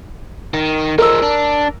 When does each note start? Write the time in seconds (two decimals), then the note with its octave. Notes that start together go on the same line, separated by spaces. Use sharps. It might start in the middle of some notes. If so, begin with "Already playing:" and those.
0.54 D#3
0.98 F3 G#3 A#4 E6
1.22 D4